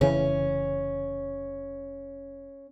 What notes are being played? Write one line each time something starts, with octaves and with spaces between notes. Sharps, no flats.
F1 C#3 E3 C#4